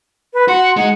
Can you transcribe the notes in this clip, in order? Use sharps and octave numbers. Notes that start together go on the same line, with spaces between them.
B4
F#4 F#5 C6
G#3 D#4 F#5